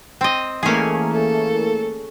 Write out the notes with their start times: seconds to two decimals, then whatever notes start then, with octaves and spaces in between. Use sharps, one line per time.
0.21 C4 D#5
0.63 E3 A3 A#3 C#4 G#4
1.12 A4